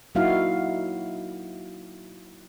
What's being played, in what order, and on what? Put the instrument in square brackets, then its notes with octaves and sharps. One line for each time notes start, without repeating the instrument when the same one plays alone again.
[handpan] F#3 A#3 D#4 E4 F#4 F5